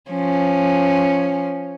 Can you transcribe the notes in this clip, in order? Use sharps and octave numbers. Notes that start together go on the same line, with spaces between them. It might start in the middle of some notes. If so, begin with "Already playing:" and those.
F3 C#4